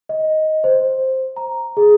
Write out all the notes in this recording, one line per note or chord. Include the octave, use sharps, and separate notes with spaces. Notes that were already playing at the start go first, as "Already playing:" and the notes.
D#5
C5
A#5
G#4